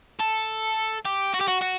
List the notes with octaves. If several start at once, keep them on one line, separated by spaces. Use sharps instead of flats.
A4
G4
F#4
G4
F#4
F#4